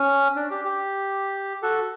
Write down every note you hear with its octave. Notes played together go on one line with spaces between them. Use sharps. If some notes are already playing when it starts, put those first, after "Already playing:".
Already playing: C#4
D4
G4
G4
F#4 A4